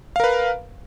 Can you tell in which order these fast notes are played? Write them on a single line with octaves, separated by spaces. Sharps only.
F5 A#4 B4